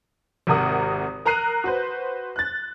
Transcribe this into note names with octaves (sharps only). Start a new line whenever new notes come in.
G#1 C3 A#4 F#5 D#6
A#4 A#5 F#6 C7 D#7
F#4 B4 C5
F#6 A6